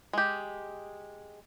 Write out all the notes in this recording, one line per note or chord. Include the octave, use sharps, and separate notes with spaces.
G#3 G4